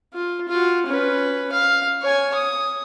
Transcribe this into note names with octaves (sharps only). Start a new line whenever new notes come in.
F4
F4 F#4
C#4 B4
F5
C#5 G#5
D#6